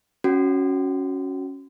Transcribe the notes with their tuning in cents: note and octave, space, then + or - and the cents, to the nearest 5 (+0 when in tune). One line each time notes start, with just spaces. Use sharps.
C#4 +0 F#4 +0